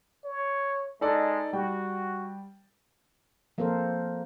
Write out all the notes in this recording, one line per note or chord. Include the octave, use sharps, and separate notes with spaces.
C#5
G#3 D#4 A4 D5
G3 F#4 G5
F3 A#3 C4 A4 A#4 C5